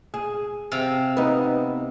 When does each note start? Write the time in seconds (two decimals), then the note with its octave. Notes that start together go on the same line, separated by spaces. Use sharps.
0.14 G#4
0.71 C3 F5
1.17 B3 D#4